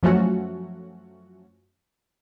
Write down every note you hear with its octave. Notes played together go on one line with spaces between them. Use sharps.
F#2 F3 F#3 A3 C#4 F#4